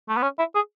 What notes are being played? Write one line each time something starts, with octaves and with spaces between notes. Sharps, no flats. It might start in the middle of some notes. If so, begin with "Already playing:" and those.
A3
B3
C#4
E4
G#4